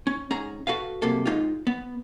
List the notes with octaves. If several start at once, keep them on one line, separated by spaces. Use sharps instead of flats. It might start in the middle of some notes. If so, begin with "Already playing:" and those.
C#4
G#2 C#4 G#4 A#5
F#4 A4 B4 F5
C2 F#2 C3 A#3 A4
G#2 G#3 D#4 F4
B3